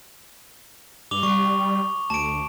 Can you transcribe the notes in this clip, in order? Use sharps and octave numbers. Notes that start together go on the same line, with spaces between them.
G2 D6 F7 G7
G3 C#6
D2 A5 D7